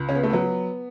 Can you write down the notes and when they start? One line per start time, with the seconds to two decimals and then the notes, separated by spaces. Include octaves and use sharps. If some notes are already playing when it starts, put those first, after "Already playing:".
Already playing: C#2
0.09 C#3 C#4
0.15 B3
0.23 A3
0.30 F#3 B3